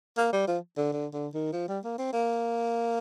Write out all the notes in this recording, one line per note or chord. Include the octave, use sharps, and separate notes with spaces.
A#3
G3
F3
D3
D3
D3
D#3
F3
G3
A#3
C4
A#3